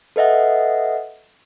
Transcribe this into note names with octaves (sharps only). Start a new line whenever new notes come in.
A4 B4 D#5 E5 F#5